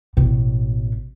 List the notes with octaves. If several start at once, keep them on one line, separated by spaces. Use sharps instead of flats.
A1 B2